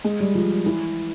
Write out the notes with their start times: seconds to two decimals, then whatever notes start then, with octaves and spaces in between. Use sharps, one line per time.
0.04 G#3
0.20 G3
0.35 F3
0.66 E3